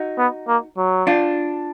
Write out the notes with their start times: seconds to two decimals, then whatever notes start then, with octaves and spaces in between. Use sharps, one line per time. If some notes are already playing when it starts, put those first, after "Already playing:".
Already playing: D#4 F#4
0.18 B3
0.48 A#3
0.77 F#3
1.07 D4 F4